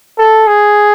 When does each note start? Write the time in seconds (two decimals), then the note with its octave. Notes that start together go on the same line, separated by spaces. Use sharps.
0.18 A4
0.47 G#4